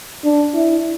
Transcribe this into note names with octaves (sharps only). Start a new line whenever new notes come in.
D4
E4